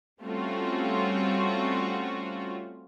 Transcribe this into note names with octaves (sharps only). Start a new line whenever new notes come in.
G3 A3 C4 C#4 F4 F#4